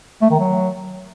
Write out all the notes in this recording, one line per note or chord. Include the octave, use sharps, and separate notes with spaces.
A3
D#3
F#3